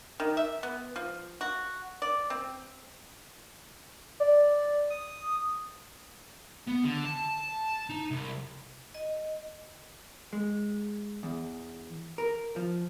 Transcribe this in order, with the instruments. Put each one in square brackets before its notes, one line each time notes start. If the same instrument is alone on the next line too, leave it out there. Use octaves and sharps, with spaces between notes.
[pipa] D#3
E5
B3
F3
F#4
D5
C4
[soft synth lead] D5
D#6
[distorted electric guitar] B3
D3
A5
D#4
C2
[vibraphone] D#5
[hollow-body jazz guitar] G#3
E2
A#4
F3